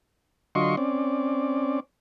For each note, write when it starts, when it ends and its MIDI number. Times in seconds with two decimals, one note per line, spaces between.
0.55 0.76 50
0.55 0.76 54
0.55 0.76 65
0.55 0.76 75
0.55 0.76 84
0.55 0.76 85
0.77 1.80 60
0.77 1.80 61
0.77 1.80 74